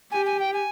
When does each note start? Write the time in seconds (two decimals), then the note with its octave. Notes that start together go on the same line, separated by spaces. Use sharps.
0.12 G4 G#5
0.26 G#5
0.40 G5
0.53 G#5